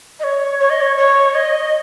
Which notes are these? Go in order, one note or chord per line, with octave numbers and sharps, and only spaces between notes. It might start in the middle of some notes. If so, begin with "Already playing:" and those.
D#5
C#5
C#5
D#5
C#5
C#5
D#5